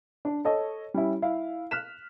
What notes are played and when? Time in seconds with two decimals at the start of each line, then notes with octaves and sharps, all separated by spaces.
0.25 D4
0.45 A4 C#5 D#5
0.94 G3 C#4 E4
1.22 E4 F5
1.71 F6 F#6 B6 E7